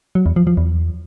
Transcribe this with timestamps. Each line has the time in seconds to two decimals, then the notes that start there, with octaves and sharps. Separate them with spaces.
0.15 F#3
0.26 E2
0.36 F3
0.47 F3
0.57 E2